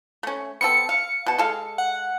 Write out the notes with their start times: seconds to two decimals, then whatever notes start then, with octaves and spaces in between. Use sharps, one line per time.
0.23 A3 C#4
0.61 B3 C4 A4 C#7
0.89 F5
1.26 B2 A5
1.38 G#3 A4 F5
1.78 F#5